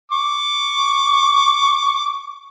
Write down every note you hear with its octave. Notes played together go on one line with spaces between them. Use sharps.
C#6 D6